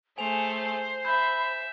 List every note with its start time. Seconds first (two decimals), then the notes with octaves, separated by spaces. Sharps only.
0.18 A3 G#4 C5 G#5 F7
1.05 E5 B5 G6